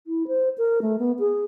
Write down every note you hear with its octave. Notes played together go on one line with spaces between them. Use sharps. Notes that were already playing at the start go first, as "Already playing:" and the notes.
E4
C5
A#4
A3
B3
G#4